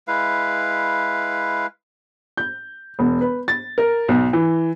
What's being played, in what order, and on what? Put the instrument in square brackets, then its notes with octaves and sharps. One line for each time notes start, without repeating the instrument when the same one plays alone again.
[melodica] G#3 E4 B4 F5
[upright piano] G6
E1
B4
A6
A#4
B1
E3